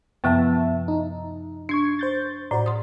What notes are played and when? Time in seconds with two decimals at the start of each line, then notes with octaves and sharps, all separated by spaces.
0.24 F#2 C3 F3 B3 E5 A5
0.88 D#4
1.69 D4 C#6 G#6 C7
1.99 C5 G6 A6
2.51 A2 F#4 C5 D5
2.66 C6 D#6